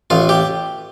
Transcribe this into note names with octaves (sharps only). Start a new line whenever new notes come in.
A1 F4
G4